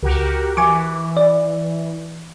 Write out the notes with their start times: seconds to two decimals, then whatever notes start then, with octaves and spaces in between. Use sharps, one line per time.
0.03 C#2 F#4 G4 A#4
0.57 E3 G#5 C#6 D6
1.17 D5